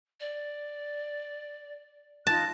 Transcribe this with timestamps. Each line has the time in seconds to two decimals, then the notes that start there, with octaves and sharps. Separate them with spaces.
0.20 D5
2.27 D#4 F4 A5 F#6